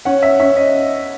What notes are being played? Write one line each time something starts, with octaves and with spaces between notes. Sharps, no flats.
C#4 F#5
E5
C#4 E5
D#5